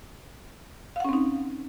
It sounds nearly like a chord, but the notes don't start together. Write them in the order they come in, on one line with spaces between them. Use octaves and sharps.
F5 F#5 C#4 C4 D#4